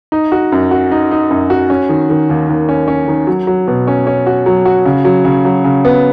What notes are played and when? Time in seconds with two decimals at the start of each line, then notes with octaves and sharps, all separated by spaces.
0.12 D#4
0.32 F#4
0.52 F#2
0.71 F#4
0.92 D#4
1.11 D#4
1.31 F#2
1.50 F#4
1.70 C#4
1.89 D#3
2.10 D#3
2.30 D#2
2.49 D#2
2.69 C#4
2.88 C#4
3.08 D#3
3.27 F#3
3.47 F#3
3.68 B2
3.87 C#4
4.07 C#4
4.27 F#4
4.46 F#3
4.65 F#4
4.85 C#3
5.05 F#3
5.25 C#3
5.45 F#3
5.64 C#3
5.85 B3